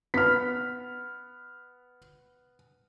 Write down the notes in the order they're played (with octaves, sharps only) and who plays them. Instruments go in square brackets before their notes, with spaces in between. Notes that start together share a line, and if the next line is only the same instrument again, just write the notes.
[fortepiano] B3 [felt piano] F6 B6